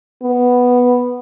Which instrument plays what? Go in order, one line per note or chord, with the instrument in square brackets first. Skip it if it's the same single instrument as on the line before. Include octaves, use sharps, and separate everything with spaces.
[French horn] B3